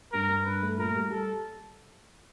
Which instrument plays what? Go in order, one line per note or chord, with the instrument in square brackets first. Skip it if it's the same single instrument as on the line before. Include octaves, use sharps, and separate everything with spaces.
[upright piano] G2 [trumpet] A#4
[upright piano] G2
[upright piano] G2 [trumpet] B4
[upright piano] A3
[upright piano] A#2 [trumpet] A#4
[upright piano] G3
[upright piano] G3 [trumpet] A4